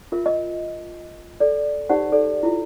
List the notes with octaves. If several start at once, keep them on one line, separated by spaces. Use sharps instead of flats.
F4 A#4 E5
D#5
A4 D5
D#4 G4 C5 D5 F#5
A4 D5
E4 F4